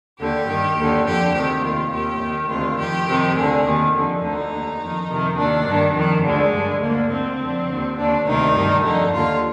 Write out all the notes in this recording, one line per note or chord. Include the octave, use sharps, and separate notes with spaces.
D#2 D3 G4
G2 D#3
D#2 D3
F2 D3 G4
D2 C3 D#3 G4
D#2 D#3 F4
D#2 D#3 G4
D#2 D#3
D2 C3 D#3 F4
F2 D#3 G4
F2 C3 D#3
D2 D3 G#4
D#2 D#3
F2 D3
D2 D3 D#4
D#2 D3
F2 D#3
F2 C3 D#3
D#2 D#3 D4
G2 D#3
F2 D#3
D2 D3 G#3
G2 D3
D2 D3 A#3
D2 D3 C4
F2 D3
D#2 D3
D#2 D3 D4
D2 C3 D#3 D#4
G2 D#3
F2 D3 D#4
D#2 D3 F4